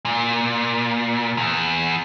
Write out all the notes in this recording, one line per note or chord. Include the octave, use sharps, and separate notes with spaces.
A#2
E2